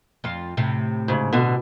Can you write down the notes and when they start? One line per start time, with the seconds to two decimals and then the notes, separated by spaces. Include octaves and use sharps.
0.24 F2 F4
0.57 A2 C3 F4
1.08 G#2 C#3
1.33 B2 D3